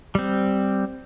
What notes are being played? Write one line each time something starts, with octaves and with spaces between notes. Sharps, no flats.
G3 C4